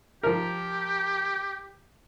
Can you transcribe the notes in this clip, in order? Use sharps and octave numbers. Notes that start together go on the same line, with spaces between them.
F3 G4 A#4